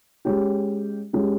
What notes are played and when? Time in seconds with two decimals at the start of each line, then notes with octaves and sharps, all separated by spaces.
0.25 G#3 C#4 G4
1.13 G#3 C#4 G4